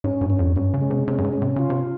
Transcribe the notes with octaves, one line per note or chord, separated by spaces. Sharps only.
G#2 C#4
G2
C#4
F2
G2 C#4
C#3
G#3
C3
C3 C#4
G2
G#2
C#4
C3
C#3 F4
C3